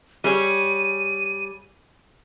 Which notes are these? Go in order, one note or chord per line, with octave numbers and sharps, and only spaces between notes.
G3 G#4 C#5 D#7